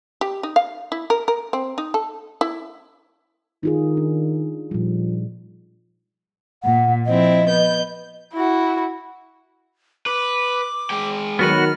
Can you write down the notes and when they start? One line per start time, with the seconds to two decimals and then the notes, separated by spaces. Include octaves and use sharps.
0.21 G4
0.43 D#4
0.56 F5
0.92 E4
1.10 A#4
1.28 A#4
1.53 C4
1.78 D#4
1.94 A4
2.41 E4
3.63 D#3 D#4 F4 G#4
3.97 D4
4.71 A#2 F3 G3
6.63 A#2 F#5
7.06 F3 C4 E4 D#5
7.47 B3 G6
8.34 E4 F#4
10.06 B4 D6
10.90 G#3 G5
11.39 D#3 F#3 B3 F#4 B4 F6